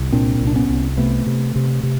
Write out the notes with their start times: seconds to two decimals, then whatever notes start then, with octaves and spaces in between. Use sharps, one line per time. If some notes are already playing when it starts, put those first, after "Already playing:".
Already playing: C2
0.12 A#2 C4 D4
0.41 C2
0.47 D4
0.56 B3 C#4
0.69 C2
0.97 C3 A3 B3
1.27 C3
1.56 C3
1.83 C3